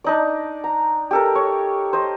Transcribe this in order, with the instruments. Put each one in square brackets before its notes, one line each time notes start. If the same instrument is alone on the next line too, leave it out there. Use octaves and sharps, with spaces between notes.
[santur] D4 D#4 D5
A#5
G4 A4 A#4
C#5
C5 D#5